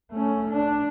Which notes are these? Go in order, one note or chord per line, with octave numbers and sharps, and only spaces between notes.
A3 C#4
D4